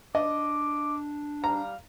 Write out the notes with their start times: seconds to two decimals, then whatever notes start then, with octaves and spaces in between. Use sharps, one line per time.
0.15 D4 D#5 D6
1.44 G3 F5 A#5